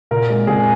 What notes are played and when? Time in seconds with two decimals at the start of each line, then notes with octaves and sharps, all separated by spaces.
0.11 A#2 A#4
0.30 G#3
0.47 A#2 G#4